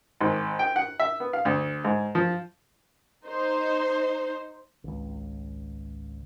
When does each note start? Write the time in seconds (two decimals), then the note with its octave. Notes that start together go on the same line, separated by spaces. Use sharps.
0.20 G#1
0.59 G5
0.76 F#5
1.00 E5
1.20 B3
1.33 F5
1.45 D2
1.85 G#2
2.15 F3
3.27 D#4 C5
4.84 G#1 C#2